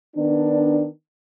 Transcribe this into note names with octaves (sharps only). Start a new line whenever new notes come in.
D#3 B3 D4